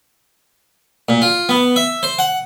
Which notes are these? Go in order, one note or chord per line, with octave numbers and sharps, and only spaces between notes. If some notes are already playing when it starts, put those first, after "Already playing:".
A#2
F4
B3
E5
C5
F#5